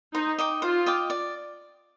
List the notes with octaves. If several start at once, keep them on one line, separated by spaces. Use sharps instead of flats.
D#4 C5
D#5 G5 D6
F4 C5
D#5 G5 D6
D5